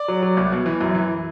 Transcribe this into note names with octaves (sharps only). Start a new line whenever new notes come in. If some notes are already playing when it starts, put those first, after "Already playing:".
Already playing: D5
F#3
F#3
C2
B2
E3
F#2
E3